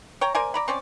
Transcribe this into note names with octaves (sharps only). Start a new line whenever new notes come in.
C#5 G5 A#5
A#4 C5 D5 G#5
D5 A#5 B5
C4 C#4 D5